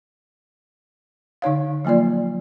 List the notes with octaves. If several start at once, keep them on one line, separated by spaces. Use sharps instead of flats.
D3 D#4 C#5 F5
F3 F#3 A#3 F4 D5